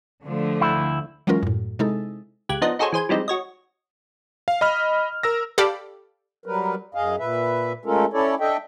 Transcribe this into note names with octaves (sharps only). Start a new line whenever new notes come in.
D3 F3 A3
D2 E4
E3 F#3 G#3 C#4 F4 A#4
F#2 A2
C3 G#3 D#4 E4 A4
C#2 G4 F#6 G#6
F3 B3 D4 D#4 D#5
D#4 F#4 G#4 A4 C5 C#5
E3 G#4 C5 G#5
E3 F3 G3 G#3 C4 D#4
F#4 C#5 D#5
F5
D#5 B5 F6
A#4 E6 A#6
G4 A4 D5 F5 B5
F#3 G3 A#4 B4
F#2 G#4 D#5 F5
A#2 B4 E5
G#3 A3 C#4 F4 A4 A#4
C#4 E4 A4 C#5 D5
D4 A4 D#5 E5 G5